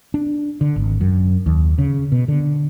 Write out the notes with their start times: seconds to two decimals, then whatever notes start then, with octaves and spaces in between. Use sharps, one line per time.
0.14 D4
0.61 D3
0.76 G#1
1.01 F#2
1.46 D#2
1.78 C#3
2.12 B2
2.28 D3